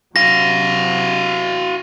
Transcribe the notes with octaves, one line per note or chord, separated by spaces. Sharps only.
C3 F#3 F#4 F5 A#6